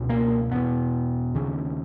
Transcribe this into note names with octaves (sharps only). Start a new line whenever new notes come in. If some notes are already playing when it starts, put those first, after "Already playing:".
Already playing: C#2 B2
A#3
E2 B2 B3
D#2 C#3